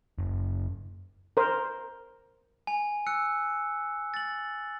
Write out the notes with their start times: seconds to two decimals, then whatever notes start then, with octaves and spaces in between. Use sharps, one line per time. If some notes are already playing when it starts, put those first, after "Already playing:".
0.18 F#1
1.37 A#4 C5
2.67 G#5
3.06 E6 F#6 C#7
4.14 A6 F#7